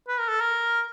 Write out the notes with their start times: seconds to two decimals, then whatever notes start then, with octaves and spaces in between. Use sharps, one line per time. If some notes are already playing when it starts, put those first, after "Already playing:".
0.08 B4
0.19 A#4
0.29 A4
0.41 A#4